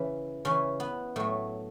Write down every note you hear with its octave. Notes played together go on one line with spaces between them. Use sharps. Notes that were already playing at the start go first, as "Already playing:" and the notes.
Already playing: C#3 E3
C#3 E3 C#4
B3
A2 F#3 A3